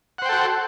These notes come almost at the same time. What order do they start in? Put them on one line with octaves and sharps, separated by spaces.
F#5 C5 G5 A4 F#4